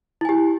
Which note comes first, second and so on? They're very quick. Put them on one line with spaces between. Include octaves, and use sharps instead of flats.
E4 G#5 G4